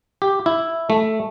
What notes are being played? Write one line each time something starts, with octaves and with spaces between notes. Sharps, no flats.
G4
E4
A3